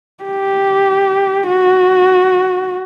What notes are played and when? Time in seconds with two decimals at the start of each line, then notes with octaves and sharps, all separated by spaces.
0.24 G4
1.47 F#4